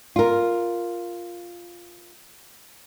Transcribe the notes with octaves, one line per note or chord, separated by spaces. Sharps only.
F4 A#4